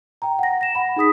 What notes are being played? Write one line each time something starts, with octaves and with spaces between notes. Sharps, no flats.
G5 A#5
F#5 A#6
A#6 E7
F#5 B5
D#4 G#4 D#6 B6